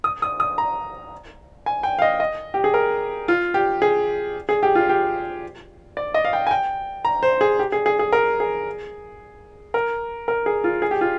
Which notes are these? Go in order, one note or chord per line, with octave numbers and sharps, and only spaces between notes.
D#6
D#6
D#6
A#5
G#5
G5
F5
D#5
D#5
G4
G#4
A#4
F4
G4
G#4
G#4
G4
F4
G4
D5
D#5
F5
G5
G#5
G5
A#5
C5
G#4
G4
G#4
G#4
G#4
A#4
G#4
A#4
A#4
G#4
F4
G#4
G4
F4